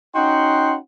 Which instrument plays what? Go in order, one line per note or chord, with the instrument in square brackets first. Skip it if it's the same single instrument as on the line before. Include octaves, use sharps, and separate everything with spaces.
[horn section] C#4 D#4 F#4 F#5 G5 C6